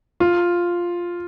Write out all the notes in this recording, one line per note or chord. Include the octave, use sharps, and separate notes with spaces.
F4